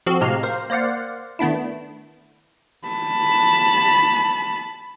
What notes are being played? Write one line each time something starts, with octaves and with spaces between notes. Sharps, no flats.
F3 C4 F#4 A4
A2 C3 G#3 G4 F5 A#5
A#4 C5 F5
A#3 C5 D5 F5 F#5
D#3 A3 B3 D4 E4
A5 B5